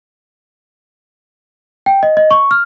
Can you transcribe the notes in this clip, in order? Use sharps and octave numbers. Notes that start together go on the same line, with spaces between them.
G5
D#5
D#5
C#6
F6